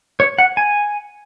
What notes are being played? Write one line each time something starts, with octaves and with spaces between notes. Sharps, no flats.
C#5
F#5
G#5